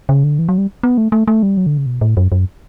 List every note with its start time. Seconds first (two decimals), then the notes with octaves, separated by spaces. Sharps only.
0.09 C#3
0.24 D3
0.39 E3
0.49 F#3
0.58 G3
0.83 B3
0.98 A3
1.12 A3
1.28 A3
1.43 G3
1.57 F#3
1.67 D3
1.78 C#3
1.86 B2
2.01 A2
2.17 F#2
2.32 F#2